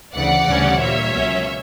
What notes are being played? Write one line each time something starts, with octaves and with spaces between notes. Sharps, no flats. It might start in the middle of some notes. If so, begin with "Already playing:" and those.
D2 C#3 E3 D5 F#5
D2 C#3 E3 G3 C#4
A#2 G3 A#3 C#5 E5
C#2 B2 F#3 A#3 C#4